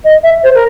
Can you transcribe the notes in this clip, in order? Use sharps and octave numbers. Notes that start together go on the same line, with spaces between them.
D#5
E5
C5
A#4